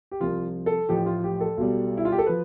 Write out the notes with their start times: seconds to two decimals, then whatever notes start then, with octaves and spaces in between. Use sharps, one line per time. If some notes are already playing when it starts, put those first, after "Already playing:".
0.12 G4
0.21 C2 C3 F3 F4
0.66 A4
0.89 A1 A2 F3 G4
1.06 F4
1.24 G4
1.40 A4
1.58 B1 B2 G3
1.97 E4
2.05 F4
2.12 G4
2.18 A4
2.26 F3 B4